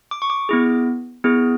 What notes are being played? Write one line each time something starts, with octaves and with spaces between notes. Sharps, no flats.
D6
C#6
D6
B3 E4 G#4
B3 E4 G#4